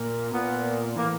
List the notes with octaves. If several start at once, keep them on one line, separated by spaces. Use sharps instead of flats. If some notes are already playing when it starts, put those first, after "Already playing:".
Already playing: A#2
A#2 B3
A2 E3 A#3